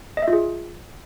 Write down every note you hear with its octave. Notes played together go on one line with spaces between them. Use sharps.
D#5
E5
F4
G#4